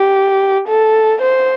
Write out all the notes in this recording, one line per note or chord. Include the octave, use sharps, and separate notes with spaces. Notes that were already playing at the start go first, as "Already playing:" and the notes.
Already playing: G4
A4
C5